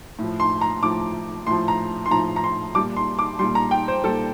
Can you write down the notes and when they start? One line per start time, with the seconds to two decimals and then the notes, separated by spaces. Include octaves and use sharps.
0.19 A2 F3
0.40 C6
0.61 A#5
0.83 A2 F3 D6
1.47 A2 F3 C6
1.68 A#5
2.06 C6
2.11 A2 F3 A#5
2.36 A#5
2.44 C6
2.75 A#2 G3 D6
2.97 C6
3.19 D6
3.39 A#2 G3 C6
3.55 A#5
3.71 G5
3.88 C5
4.04 A#2 G3 A4